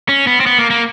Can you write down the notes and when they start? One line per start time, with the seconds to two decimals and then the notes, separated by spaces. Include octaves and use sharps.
0.09 C#4
0.27 B3
0.40 C4
0.46 B3
0.58 A#3
0.71 A#3